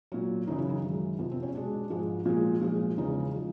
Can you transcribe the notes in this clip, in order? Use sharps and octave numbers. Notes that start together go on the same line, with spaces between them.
A#2 F#3
F#2 C#3 E3 D#4
E4
D#4
F#2 D#3 G#3
F2 C3 F3 B3
C4
C#4
B2 G#3 D4
G#2 F3 G#3
A#2 F3 G#3
A#2 F3 G#3
E2 C#3 F3 G#3 D#4
F3 G#3